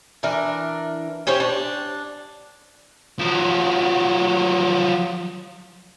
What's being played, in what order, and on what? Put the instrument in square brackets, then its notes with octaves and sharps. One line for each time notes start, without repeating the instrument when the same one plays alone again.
[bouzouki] E3 D4 A#4
C#4 G4 C5 C#5
D4
[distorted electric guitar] F3 F#3